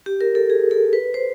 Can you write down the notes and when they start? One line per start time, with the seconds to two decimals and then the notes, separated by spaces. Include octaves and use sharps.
0.06 G4
0.21 A#4
0.35 A4
0.50 G#4
0.71 A4
0.93 B4
1.14 C5